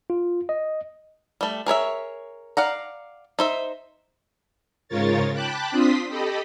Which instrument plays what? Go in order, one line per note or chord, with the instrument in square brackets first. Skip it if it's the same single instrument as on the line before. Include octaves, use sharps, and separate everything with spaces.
[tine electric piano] F4
D#5
[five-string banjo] G3 A3
G#4 A#4 C#5 E5
D5 F5 F#5 A#5
D#4 C5 E5
[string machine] G#2 C#3 F4 A#4 C#5 A6
G5 A5 B5 D6 F#6
C4 D4 F4 C6 D#6 B6
G4 A4 D#5 B5